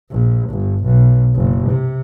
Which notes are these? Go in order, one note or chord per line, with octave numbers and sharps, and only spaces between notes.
A#1
G1
B1
F#1
C3